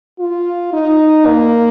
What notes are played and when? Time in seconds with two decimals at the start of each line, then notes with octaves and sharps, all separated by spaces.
0.20 F4
0.73 D#4
1.26 A#3